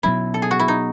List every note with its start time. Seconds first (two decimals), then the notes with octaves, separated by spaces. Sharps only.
0.03 B2 F#3 C#4 E4
0.34 A4
0.42 G#4
0.51 F#4
0.59 E4
0.68 D#4